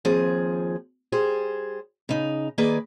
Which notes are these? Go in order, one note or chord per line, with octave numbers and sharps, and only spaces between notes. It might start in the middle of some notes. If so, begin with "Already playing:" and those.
D#2 F3 C4 G#4
G3 G#4 C5
C#3 D#4
D#3 A#3 G#4 B4 D5